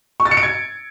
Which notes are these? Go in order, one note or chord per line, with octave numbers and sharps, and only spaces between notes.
C#6
A6
C#7
D7
G#6